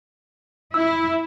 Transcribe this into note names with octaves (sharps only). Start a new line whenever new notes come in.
E4 E6